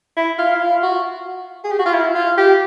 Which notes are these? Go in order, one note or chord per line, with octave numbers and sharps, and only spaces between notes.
E4
F4
E4
F4
F#4
G#4
G4
F#4
F4
E4
F4
G4